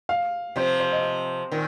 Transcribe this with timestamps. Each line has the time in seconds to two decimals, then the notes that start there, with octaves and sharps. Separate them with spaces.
0.09 F5
0.56 C3 F3 C5
0.80 C5
0.92 D#5
1.51 A#2 D#3